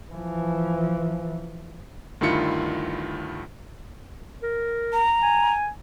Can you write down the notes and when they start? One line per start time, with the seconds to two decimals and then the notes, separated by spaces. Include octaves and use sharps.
0.13 E3 F3
2.21 D2 G2 D#3 E4 F4 C#7
4.43 A#4
4.93 A#5
5.22 G#5